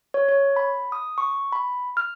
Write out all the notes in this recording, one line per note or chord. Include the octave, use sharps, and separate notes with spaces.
C#5
C#5
B5
D#6
C#6
B5
F6